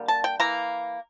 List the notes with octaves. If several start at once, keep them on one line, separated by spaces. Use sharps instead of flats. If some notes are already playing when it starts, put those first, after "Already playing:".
Already playing: D3 G3 A#3
A5
G5
E3 A#3 A#5